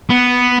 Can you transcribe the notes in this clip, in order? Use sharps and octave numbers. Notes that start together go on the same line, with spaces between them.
B3